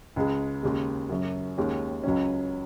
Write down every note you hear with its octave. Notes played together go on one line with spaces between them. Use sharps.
C#2 C#3 G#3
D#2 C#3 G#3
F#2 C#3 F#3
D#2 D#3 G#3 C#4
C#2 C#3 F#3 C#4